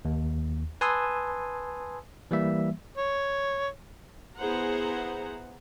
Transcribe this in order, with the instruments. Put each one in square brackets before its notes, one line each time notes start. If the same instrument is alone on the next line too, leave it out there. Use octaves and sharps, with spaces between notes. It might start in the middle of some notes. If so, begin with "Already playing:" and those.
[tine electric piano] D#2
B4 G#5 A5 C6 D#6 E6
E3 G3 A#3 E5
[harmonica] C#5
[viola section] B3 E4 G#4 C5 F#5 A#5